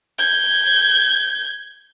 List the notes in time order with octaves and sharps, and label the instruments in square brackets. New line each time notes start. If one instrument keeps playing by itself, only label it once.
[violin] G6 G#6